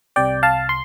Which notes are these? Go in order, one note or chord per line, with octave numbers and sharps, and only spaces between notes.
C2 C3 D5 G5
F5 A5
C6